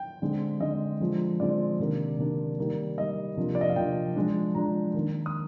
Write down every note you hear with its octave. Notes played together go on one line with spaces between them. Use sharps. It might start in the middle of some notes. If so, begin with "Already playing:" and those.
Already playing: G5
D3 G#3 C4
D3 G#3 C4 D#5
D3 F3 G#3 C4
D3 F3 G#3 C4 D5
C3 D#3 A#3 D4
C3 D#3 A#3 D4
D#3 G3 A#3
D#3 G3 A#3 D#5
C3 F3 A#3 D4
D5
D#5
F5
C3 F3 A#3 D4 G5
F3 G#3 D4
F3 G#3 D4 A#5
D#3 A#3 D4
D#6